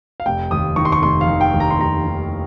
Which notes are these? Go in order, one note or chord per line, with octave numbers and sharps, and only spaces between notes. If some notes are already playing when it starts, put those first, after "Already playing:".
F5
F1 G5
D#2 D#6
D#3 C#6
C6
C#6
F1 C6
F5
D#3
G5
D#2
A#5
C6
F1 A#5
D#3